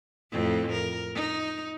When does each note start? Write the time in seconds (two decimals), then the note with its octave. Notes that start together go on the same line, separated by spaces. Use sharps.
0.32 F2 A2 C4
0.72 A#4
1.14 D#4